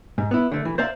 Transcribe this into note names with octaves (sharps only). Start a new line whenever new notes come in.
G#2
B3 E4
D3 A3
E3
C5 D5 E5 F5 A#5